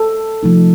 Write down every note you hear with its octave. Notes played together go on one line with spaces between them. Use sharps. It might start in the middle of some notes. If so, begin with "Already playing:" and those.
Already playing: A4
C3 F3 A3 D#4